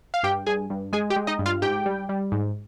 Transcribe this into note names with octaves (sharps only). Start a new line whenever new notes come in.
F5
G2 G4 G5
G2 G#4 G#5
G2
G#3 G#4 G#5
G4 G5
G#3
D#4 D#5
G2
F4 F5
G#2 G4 G5
G3
G3
G#2